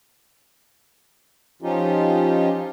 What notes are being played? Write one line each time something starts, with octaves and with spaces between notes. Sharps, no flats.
F3 C#4 D#4 F4 G4